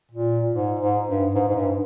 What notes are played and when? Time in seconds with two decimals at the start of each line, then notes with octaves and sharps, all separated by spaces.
0.11 A#2
0.53 G#2
0.80 G#2
1.07 G2
1.35 G#2
1.48 G#2
1.55 G2